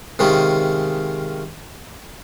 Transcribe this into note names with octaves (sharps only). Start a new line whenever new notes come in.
C3 D#3 G#3 C#4 F4